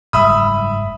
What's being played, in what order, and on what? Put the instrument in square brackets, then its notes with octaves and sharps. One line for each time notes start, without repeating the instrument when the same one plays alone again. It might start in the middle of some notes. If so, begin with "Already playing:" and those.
[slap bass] F#1 G#2 G3 [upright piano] E5 B5 D#6